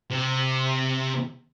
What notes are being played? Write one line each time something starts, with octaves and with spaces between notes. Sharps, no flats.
C3